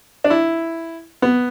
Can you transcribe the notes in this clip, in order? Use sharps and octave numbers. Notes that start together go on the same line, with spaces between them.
D4
E4
B3